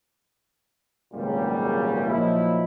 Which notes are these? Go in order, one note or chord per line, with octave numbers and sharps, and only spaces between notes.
G#1 C#2 F#2 A#2 C#3 G3
A#2 F3 F#3 A#3 D#4 E4